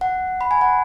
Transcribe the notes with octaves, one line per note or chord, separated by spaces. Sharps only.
F#5
B5
G#5
F#5